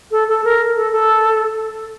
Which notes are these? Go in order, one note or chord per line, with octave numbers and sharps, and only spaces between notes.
A4
A4
A#4
A4
A4